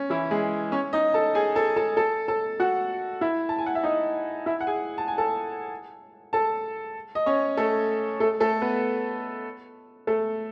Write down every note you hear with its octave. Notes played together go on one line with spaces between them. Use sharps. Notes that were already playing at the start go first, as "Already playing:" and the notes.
Already playing: C#4
E3 E4
G#3 G#4
C#4 C#5
D#4 D#5
A4 A5
G#4 G#5
A4 A5
A4 A5
A4 A5
A4 A5
F#4 F#5
E4 E5
A5
G#5
F#5
E5
D#4 D#5
E4 E5
F#5
G#4 G#5
A5
G#5
A4 A5
A4 A5
D#5
C#4 C#5
A3 A4
A3 A4
A3 A4
B3 B4
A3 A4